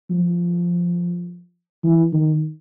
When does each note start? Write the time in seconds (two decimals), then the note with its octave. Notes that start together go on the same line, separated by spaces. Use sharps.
0.11 F3
1.84 E3
2.13 D#3